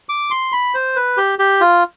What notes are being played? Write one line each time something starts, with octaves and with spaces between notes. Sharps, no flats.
D6
C6
B5
C5
B4
G4
G4
F4